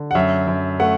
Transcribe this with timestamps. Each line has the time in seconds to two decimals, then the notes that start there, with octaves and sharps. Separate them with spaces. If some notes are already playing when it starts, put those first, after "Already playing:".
Already playing: D3
0.11 F#5
0.15 F#2 E5
0.48 F#2
0.80 A3 F#5